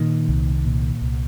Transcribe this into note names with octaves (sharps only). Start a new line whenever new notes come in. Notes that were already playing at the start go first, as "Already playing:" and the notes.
Already playing: A#2 D#3
C2
A#2
C2